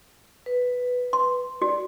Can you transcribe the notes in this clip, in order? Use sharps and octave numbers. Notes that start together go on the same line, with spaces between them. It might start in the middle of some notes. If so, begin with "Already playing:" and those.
B4
C6
F#4 D5